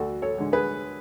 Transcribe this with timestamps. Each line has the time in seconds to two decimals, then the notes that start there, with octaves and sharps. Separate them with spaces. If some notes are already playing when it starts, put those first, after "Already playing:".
Already playing: D2 F#4 A4
0.22 A4 C#5
0.38 D3 G#3
0.52 G#4 B4